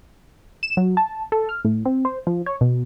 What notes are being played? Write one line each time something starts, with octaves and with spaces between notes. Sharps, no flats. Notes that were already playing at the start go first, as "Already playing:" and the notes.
E7
F#3
A5
A4
F6
A2
C4
C5
F3
C#5
B2